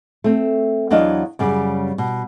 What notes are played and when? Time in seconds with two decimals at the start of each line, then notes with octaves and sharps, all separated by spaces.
0.24 A3 C4
0.90 E2 F#3 D4 D#5 F5
1.39 F#2 C#3 G3
1.98 B2